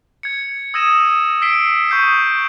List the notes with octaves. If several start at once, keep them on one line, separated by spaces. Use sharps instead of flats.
G#6 C#7
D#6 E6 G#6 A#6 D#7 E7
E6 B6 C7 D7 G7
C#6 D#6 G6 C7